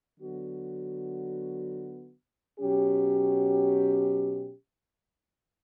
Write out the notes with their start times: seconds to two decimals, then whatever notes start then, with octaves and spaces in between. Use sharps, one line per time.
0.19 D3 F#3 B3 F#4
2.59 B2 F#3 C#4 G4